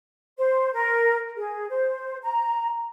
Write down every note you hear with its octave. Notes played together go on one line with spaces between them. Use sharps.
C5
A#4
G#4
C5
A#5